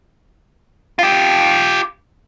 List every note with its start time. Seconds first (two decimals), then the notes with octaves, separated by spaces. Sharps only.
0.99 F4 G4